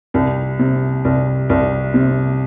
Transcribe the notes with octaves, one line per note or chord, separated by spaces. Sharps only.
C2
C3
C2
C2
C3